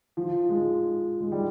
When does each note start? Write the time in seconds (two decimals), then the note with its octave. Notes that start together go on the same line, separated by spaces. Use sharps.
0.17 F3
0.49 G#3
1.21 G#3
1.32 G3